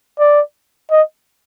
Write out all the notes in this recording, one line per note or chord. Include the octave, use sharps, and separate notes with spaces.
D5
D#5